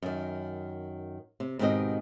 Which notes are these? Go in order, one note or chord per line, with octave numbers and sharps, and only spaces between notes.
F#2 D#3
C3
G#2 B2 D#3 C4 G4 D#5